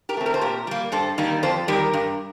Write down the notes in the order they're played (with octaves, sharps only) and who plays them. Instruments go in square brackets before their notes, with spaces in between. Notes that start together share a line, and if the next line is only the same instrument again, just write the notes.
[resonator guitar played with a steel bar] G4 A#4
A3 C4
A#4
C5
A#2 G4 A#4
G3 A#3
G2 A4 C5
D#3 G3 A#3
F2 A4 C5
D#3 G3 G4 A#4
G2